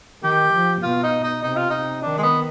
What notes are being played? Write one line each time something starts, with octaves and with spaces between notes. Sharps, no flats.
D#3 G4
F3
B2 F4
D#4
D#4
C3 D#4
F4
D#4
D#3 D4
G#3
B3